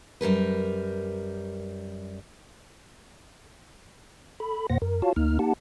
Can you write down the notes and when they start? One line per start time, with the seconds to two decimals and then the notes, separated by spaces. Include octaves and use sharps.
0.21 F#2 G3 A#4 B4
4.40 A4 B5
4.70 F2 B2 A#3 C5 F#5 A#6
4.82 F#2 A#4
5.02 F4 F#4 C#5 F5 A5
5.16 D2 A#3 D#4 F6
5.39 A#3 D#4 G4 F#5 A5